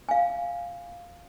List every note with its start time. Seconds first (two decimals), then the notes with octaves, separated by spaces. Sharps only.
0.09 F5 G#5